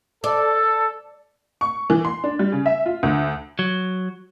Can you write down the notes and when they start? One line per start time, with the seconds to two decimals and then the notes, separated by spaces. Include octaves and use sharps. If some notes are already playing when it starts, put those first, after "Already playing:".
0.24 A4 D5
1.61 C#6
1.90 E3
2.05 C6
2.24 D4
2.39 G3
2.52 C#3
2.66 E5
2.86 F4
3.03 D2
3.59 F#3